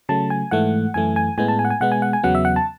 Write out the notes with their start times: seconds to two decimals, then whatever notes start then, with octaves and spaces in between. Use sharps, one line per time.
0.09 C#3 F#3 A3 A5
0.30 G#5
0.51 G#2 E3 A3 F#5
0.94 F#2 E3 A3 G#5
1.16 G#5
1.38 A2 G#3 B3 G#5
1.48 A5
1.59 G#5
1.65 F#5
1.70 G#5
1.81 B2 G#3 B3 F#5
1.92 G#5
2.02 F#5
2.13 G#5
2.23 E2 C#3 F#3 B3 F#5
2.35 E5
2.45 F#5
2.56 A5